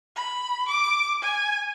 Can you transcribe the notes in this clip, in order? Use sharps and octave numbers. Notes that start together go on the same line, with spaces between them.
B5
D6
G#5